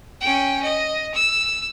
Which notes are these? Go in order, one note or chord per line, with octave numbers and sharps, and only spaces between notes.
C#4 G5
D#5
E6